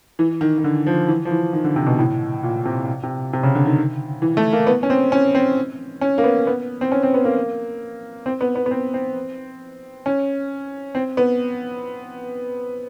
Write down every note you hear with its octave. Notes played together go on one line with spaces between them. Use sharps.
E3
D#3
D#3
D3
F3
E3
F3
E3
D#3
D3
C3
B2
A2
A#2
C3
C3
C3
C#3
D3
D#3
E3
A3
A#3
B3
C#4
C4
C#4
C4
C#4
A#3
B3
B3
C4
C#4
C4
B3
A#3
C4
B3
B3
B3
C4
C4
C#4
C4
B3